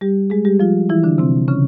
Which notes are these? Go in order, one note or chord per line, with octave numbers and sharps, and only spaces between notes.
G3 G4
G#3 G#4
G3 G4
F3 F4
E3 E4
D3 D4
C3 C4
C#3 C#4